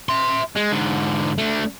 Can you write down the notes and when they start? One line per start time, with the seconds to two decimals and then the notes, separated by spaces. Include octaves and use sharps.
0.09 E5 C6
0.55 G#3
0.72 G#2 D3
1.38 A3 D4